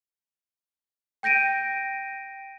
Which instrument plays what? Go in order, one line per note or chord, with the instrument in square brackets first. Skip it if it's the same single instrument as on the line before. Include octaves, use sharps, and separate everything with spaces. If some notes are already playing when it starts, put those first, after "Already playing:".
[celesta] G5 G6 A#6 D7 D#7